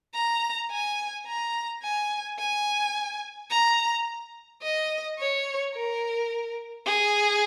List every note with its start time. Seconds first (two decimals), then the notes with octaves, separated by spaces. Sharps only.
0.14 A#5
0.71 G#5
1.27 A#5
1.83 G#5
2.39 G#5
3.51 A#5
4.63 D#5
5.19 C#5
5.75 A#4
6.86 G#4